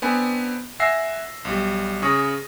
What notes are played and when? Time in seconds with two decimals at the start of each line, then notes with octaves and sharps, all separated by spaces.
0.02 B3 C4 D4 G#5 B5
0.80 E5 F#5 G#5 E6 A#6 C7
1.45 B1 G3
2.02 C#3 G#4 C#6 D#6 A#6